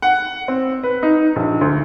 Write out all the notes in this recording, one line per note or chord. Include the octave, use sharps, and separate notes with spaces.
F#5
C4
B4
D#4
A#1
D2